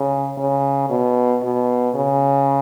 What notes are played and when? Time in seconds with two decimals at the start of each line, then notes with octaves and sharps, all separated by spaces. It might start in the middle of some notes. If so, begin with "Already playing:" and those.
Already playing: C#3
0.37 C#3
0.90 B2
1.43 B2
1.95 C#3